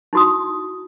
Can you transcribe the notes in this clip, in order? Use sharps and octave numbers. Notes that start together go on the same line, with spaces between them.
D#4 E4 F#4 C6 D#6